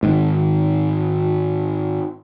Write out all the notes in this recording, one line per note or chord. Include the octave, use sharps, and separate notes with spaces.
G#2 D#3